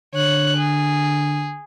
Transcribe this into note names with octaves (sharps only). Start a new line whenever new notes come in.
D3 C#5 F#6
G#4